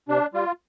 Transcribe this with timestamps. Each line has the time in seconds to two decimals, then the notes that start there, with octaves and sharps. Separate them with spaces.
0.08 C3 D4
0.34 G3 F4